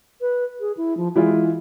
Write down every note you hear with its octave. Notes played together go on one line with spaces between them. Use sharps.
B4
G#4
E4
F3
E3 G#3 E4 F4